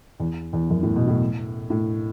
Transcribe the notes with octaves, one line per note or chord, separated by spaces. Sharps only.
E2
E2
F#2
A2
B2
A2
A2